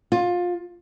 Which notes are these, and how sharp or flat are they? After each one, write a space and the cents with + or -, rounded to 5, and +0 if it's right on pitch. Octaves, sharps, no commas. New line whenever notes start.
F4 +20